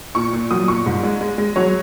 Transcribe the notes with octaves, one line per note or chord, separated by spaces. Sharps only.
A#2 C#6
A#2
F#3 D#6
A#2 C#6
G#2
G#3
G#3
G#3
F#3 C#5